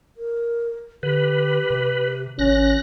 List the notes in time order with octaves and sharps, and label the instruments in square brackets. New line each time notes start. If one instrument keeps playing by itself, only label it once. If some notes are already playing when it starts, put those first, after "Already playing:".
[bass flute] A#4
[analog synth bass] D3 [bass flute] G4 [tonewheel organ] B4
[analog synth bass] C3
[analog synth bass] G#1 [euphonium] C#4 [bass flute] C#5 [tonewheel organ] F#6 A#6